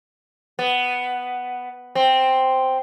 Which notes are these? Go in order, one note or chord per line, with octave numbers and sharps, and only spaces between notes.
B3
C4